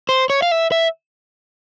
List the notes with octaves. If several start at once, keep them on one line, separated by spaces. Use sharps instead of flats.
C5
C#5
F5
E5
E5